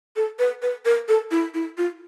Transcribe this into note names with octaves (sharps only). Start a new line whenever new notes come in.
A4
B4
B4
A#4
A4
E4
E4
F4